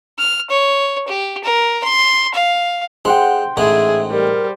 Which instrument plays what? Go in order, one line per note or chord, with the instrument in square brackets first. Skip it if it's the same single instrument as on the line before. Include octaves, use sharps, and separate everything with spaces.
[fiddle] F6
C#5
G4
A#4
C6
F5
[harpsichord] G#3 [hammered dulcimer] C5 F#5 G5
[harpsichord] A1 G#2 G#3 [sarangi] G#4 [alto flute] E5
[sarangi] G3 [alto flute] A#4